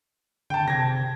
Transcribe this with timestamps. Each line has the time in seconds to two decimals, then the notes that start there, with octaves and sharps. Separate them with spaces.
0.50 D3 G5 A5
0.68 C3 G#6 A#6